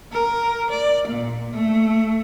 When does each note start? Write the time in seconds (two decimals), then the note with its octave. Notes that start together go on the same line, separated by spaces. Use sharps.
0.13 A#4
0.69 D5
1.07 A#2
1.53 A3